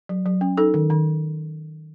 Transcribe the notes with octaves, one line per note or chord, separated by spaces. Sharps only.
F#3
F#3
C#4
D#4 A4
D#3
D#3